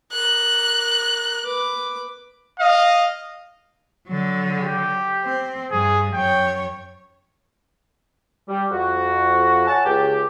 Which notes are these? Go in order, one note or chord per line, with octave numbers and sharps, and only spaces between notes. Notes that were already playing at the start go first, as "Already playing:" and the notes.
A#4 F#6
B4 D6
D#5 F5
D3 F#3
G4
C4
G2 G#4
F#2 C#5 G5
G3
F2 F#4
C#5 F#5 G#5 A5
C#2 G4